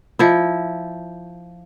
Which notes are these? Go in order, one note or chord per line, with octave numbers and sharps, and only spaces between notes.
F3 E4